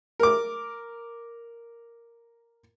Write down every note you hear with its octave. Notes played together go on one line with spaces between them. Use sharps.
A#4 D6